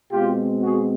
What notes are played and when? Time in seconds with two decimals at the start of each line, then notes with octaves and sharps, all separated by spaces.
0.12 B2 G#3 C4 F4 G4
0.61 F#4 G#4